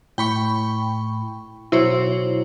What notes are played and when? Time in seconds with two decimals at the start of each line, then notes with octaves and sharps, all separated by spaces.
0.18 A2 G5 B5 C#6
1.72 B2 F#3 E4 C5 C#5